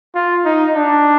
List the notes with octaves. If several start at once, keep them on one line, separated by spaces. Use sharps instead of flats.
F4
D#4
D4